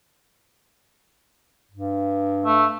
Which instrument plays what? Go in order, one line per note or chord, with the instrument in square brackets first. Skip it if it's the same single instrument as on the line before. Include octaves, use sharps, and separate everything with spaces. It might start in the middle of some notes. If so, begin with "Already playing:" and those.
[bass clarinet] G2
[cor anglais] A3